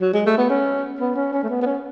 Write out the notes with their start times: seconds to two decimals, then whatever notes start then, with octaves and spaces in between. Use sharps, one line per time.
0.01 F#3
0.13 G#3
0.26 A3
0.38 B3
0.50 C#4
1.00 B3
1.16 C#4
1.33 C#4
1.43 A3
1.49 B3
1.61 B3
1.66 C#4